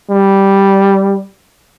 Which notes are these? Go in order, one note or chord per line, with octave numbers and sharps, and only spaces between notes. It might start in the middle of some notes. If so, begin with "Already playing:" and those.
G3